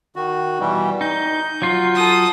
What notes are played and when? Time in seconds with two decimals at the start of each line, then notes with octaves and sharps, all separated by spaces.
0.16 D#3 F#4
0.60 B2 E3 G3
1.01 D#4 G6
1.62 F#3 F4
1.95 A4 D#6